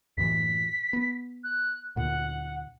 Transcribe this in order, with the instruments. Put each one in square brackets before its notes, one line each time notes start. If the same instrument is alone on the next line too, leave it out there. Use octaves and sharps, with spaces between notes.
[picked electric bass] F#2 A2 E3 [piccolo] B6
[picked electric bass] B3
[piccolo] F#6
[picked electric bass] D2 A#2 [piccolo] F#5